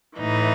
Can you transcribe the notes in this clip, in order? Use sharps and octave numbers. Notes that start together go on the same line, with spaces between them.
A2 E3 D#4